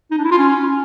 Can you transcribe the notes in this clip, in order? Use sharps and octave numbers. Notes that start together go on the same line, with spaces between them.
D#4
D4
E4
F4
C#4